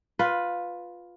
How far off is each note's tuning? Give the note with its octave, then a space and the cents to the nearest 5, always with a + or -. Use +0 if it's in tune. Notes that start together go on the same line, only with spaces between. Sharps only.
F4 +10 B4 +0